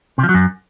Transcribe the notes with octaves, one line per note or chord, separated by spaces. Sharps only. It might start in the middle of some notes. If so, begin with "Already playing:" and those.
C3
F3
F#3
F#2